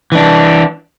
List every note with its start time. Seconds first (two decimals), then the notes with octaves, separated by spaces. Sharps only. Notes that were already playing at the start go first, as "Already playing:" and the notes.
0.12 E3 D4